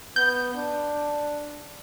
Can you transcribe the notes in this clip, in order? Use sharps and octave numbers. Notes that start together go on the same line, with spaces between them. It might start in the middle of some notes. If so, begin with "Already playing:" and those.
B3 G6
D4